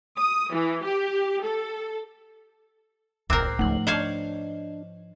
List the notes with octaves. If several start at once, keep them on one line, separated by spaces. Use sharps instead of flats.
D#6
E3
G4
A4
E1 C#2 A2 C4 A#4 D6 F#6 C7
C#2 G#2 F3 A3 F#7
D4 C5 C#5 D#5 F5